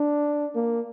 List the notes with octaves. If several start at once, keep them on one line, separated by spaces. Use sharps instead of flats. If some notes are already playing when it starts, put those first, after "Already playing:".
Already playing: D4
A#3